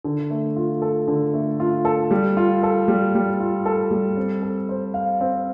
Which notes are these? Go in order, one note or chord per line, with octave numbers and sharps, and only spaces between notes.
D3
A3
F4
A4
D3
A3
F4
A4
G3
F4
A4
G3
G3
F4
A4
G3
C4
A4
C5
F5
C4